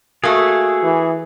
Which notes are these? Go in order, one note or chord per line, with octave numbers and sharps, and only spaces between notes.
A3 A#3 F#4 G#4 C#6 D#6 E6
E3